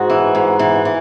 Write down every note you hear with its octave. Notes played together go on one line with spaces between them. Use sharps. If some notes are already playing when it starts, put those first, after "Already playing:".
Already playing: G#2 F#4
E3
G#2
E3
E3